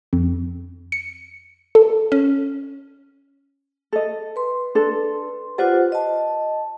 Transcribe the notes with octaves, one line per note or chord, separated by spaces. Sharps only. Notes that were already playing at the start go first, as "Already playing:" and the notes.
F2
C#7
A4
C#4
A4 D#5
B4 C6
D4 A4
F4 G4 B4 C5 D5 F#5
D#5 A5